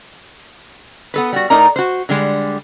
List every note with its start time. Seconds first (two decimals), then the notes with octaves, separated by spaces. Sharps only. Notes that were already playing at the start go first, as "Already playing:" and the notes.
1.14 B3 A4 B4
1.33 G3 F#4
1.50 A2 A3 D#4 A#4 D5 A#5
1.76 F#4 C5
2.09 D3 G3 G#3